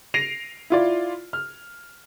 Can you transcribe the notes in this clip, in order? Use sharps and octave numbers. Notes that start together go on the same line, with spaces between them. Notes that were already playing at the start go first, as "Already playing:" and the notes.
A#6 C7 D7 D#7 F7
E4 F4 D5
F6